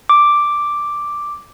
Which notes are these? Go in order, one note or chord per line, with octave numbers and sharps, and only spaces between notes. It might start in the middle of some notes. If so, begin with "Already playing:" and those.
D6